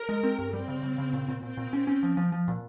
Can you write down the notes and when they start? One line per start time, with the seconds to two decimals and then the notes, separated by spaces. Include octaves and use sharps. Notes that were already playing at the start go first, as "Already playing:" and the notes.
Already playing: A#4
0.09 G#3
0.23 C4
0.39 G2
0.53 G3 C4
0.68 C#3
0.83 C#3
0.98 C#3
1.13 A#2
1.28 A#2
1.42 A#2 C4
1.57 A#2
1.73 C#4
1.87 C#4
2.03 F3
2.17 F3
2.32 F3
2.48 A#2